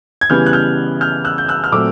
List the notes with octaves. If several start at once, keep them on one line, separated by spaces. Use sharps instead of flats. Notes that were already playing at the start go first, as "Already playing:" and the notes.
G#6
C#3 E3 G3 B3 F6 G6
F#6
F6 G6
F6 G6
E6 F#6
G6
E6 F#6
F6
A#2 F#3 A3 C4 D6 E6